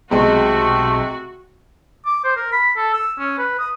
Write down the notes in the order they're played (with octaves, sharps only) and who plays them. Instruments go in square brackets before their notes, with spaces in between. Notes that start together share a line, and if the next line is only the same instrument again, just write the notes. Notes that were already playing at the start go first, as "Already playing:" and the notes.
[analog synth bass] B1 [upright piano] C3 G#3 [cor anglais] A3 [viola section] F#4
[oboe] D6
C5
A#4
B5
A4
E6
C#4
B4
D#6